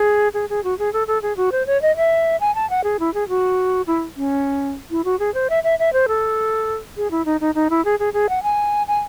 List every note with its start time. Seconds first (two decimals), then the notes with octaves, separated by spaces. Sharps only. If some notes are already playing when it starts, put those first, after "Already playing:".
Already playing: G#4
0.34 G#4
0.50 G#4
0.64 F#4
0.79 G#4
0.93 A4
1.07 A4
1.22 G#4
1.37 F#4
1.52 C5
1.67 C#5
1.82 D#5
1.97 E5
2.40 G#5
2.55 A5
2.70 F#5
2.84 G#4
3.00 E4
3.14 G#4
3.29 F#4
3.87 E4
4.16 C#4
4.91 E4
5.05 F#4
5.19 G#4
5.34 C5
5.50 E5
5.64 E5
5.79 E5
5.93 C5
6.08 A4
6.97 G#4
7.11 E4
7.25 D#4
7.41 D#4
7.55 D#4
7.70 E4
7.85 G#4
7.99 G#4
8.13 G#4
8.29 F#5
8.43 G#5
8.88 G#5